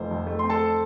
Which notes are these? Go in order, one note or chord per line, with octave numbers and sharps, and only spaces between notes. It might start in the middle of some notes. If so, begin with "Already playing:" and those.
Already playing: F1 F3 A3 C5
F2
A3
C4 C6
A4 A5